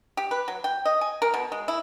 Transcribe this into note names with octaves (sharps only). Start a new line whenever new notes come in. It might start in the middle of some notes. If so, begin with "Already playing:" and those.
G4
B4
F#3
G5
D#5
G#5
A#4
B2
G#3
E4